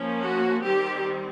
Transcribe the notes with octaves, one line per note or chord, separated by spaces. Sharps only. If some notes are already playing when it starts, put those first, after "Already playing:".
Already playing: F3 A#3 C#4
F#4
D#3 G3 C4 G4